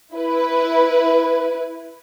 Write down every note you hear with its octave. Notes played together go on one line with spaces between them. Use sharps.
E4 B4